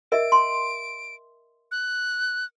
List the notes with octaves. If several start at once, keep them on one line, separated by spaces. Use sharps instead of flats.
A#4 D#5 E5 D7
C6
F#6